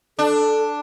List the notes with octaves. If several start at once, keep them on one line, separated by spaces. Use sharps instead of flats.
D4 A4